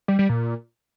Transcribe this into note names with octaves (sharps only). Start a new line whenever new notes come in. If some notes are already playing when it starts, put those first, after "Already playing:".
G3
G3
A#2